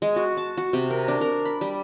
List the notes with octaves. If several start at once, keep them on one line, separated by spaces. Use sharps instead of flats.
G#3
F#4
A5
F#4
C3
A#4
D4
A#4
B5
G3